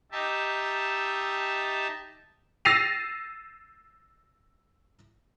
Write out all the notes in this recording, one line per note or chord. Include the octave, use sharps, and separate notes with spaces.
D#4 G4 E5 A5
E6 A6 A#6 C7 D#7 F7